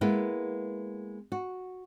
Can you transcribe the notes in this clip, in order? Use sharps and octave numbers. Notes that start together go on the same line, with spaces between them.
G#3 A#3 B3 E4
F#4